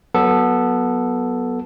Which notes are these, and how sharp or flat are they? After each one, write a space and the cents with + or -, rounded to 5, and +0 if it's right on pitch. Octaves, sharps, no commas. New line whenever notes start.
F#3 +0 B3 -15 A4 +0